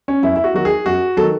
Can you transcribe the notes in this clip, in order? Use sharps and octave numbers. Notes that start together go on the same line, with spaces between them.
C#4
F#2 E4
E4
F#4
D#3 F#3 F#4
G#4
F#2 F#4
D#3 F#3 A4